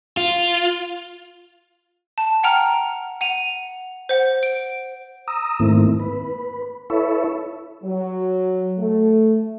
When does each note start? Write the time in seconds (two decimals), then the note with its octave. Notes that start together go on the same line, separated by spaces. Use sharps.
0.17 F4
2.18 A5
2.44 F#5 G5 A#5 F6
3.21 F#5 D#7 F7
4.09 C5 F#5
4.43 D7
5.28 A#5 D#6 E6
5.60 G#2 D#3 A3 A#3 C4 E4
6.00 B4
6.90 E4 A4 B4 C#5 E5
7.84 F#3
8.79 A3